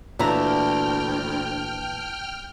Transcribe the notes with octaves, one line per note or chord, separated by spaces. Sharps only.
D2 A#2 E3 D4 E5 G5 A#5 F6